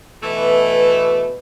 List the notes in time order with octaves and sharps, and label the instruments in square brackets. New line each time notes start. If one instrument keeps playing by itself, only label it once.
[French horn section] B2 B4 [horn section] E3 A3